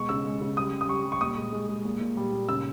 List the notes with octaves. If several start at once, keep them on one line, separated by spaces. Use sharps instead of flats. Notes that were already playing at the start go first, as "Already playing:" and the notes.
Already playing: B2 G#3 C#6
C#3 E6
G#3
C#3
G3 D#6
G3
D#6
G3 C#6
G3
C#6
A#2 D#6
G#3
G#3
G#3
A#2
A#2
G3
A#2
C#3 E6